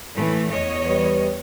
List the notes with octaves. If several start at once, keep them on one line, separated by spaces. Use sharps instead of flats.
A2 E3 A3
E2 C#5 D#5
G3 B4